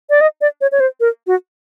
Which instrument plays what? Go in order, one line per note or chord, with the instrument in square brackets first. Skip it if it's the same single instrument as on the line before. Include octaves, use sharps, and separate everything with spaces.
[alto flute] D5
D#5
D5
C#5
C#5
C5
A#4
F#4